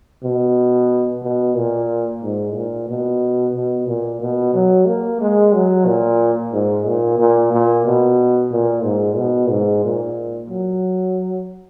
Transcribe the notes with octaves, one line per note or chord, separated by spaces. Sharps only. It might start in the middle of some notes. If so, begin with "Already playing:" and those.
B2
B2
A#2
G#2
A#2
B2
B2
A#2
B2
F#3
A#3
G#3
F#3
A#2
G#2
A#2
A#2
A#2
B2
A#2
G#2
B2
G#2
A#2
F#3